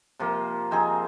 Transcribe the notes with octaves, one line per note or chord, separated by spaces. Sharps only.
C3 F3 A#3
F3 C4 D#4 G#4